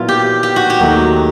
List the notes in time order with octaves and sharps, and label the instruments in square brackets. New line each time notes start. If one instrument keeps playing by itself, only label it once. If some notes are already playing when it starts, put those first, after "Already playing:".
Already playing: [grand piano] A#2 F#3 B3 E4 [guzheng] F4
[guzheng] G4
G4
F#4
G4
[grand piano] D#2 D#3 F#3 A3